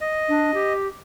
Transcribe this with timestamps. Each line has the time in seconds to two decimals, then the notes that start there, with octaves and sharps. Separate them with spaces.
0.01 D#5
0.29 D4
0.54 G4